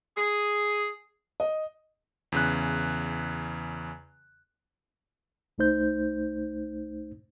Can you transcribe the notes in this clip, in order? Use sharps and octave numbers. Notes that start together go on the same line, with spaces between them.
G#4
D#5
E2 C#3 F#6
C2 A3 D#4 C5 G6